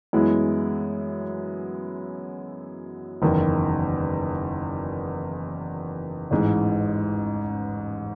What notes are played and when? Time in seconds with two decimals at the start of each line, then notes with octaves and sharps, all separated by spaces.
0.13 F#2 E3 G#3 B3 E4
3.22 F#1 E2 D#3
6.31 A1 G#2 E3 G#3